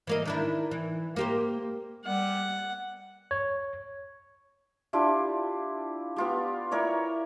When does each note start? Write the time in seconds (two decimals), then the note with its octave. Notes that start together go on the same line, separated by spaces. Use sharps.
0.07 E3 A#3 D#5
0.26 D#3 D4 E4
0.71 E3
1.16 A#3 G4 C5
2.05 G3 F#5
3.31 C#5
4.93 D4 E4 F4 G4
6.16 B3 F4 G4
6.71 E4 A#4 C#5 D5